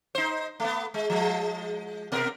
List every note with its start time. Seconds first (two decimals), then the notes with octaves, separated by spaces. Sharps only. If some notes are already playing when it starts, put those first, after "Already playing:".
0.15 D#4 C5
0.60 A3 B3
0.94 G#3
1.10 F3 G#3
2.12 B2 B3 A#4